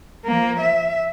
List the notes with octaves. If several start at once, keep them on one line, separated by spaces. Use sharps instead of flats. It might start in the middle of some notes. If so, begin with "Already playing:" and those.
F3 A#3
E5